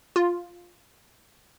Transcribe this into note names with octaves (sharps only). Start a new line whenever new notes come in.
F4